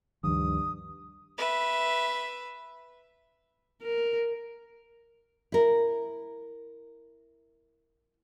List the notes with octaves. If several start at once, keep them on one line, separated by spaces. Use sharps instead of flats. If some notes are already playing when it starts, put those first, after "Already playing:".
D2 G2 D#3 F3 D#6
B4 E5
A#4
E4 A#4